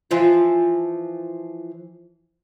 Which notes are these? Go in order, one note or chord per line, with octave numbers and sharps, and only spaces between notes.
E3 F3 F4